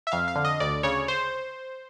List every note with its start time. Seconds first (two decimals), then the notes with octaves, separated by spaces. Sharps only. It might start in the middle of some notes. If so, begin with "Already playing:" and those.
0.07 E5
0.12 F2 F5
0.28 F5
0.36 D3
0.45 D#5
0.60 D2 D5
0.83 C#3 C#5
1.08 C5